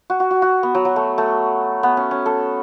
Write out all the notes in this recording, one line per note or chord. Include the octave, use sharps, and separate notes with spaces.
F#4
F#4
F#4
F#4
B3
F#3
F#3
A3
A3
B3
C#4
C#4
A4